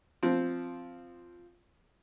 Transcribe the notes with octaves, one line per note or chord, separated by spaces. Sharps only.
F3 C4